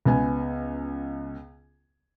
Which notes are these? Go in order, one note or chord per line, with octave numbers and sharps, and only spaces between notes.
C#2 B3 G#5